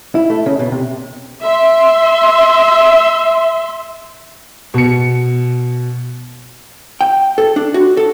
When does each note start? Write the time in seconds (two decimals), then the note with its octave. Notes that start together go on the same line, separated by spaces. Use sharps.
0.15 E4
0.30 A3
0.46 C#3
0.59 B2
0.72 C3
1.44 E5 C6
4.74 B2 C#7
7.01 G5
7.38 A4
7.56 D4
7.74 F#4
7.97 A4